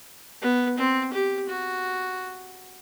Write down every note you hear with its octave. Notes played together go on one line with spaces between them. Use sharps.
B3
C4
G4
F#4